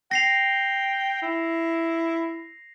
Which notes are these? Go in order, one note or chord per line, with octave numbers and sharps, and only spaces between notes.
G5 A#6 C7 F7
E4